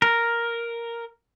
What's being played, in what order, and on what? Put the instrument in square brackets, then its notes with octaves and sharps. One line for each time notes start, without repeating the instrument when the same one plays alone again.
[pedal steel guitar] A#4